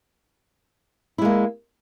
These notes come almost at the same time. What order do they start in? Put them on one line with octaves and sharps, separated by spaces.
E4 G#3 A#3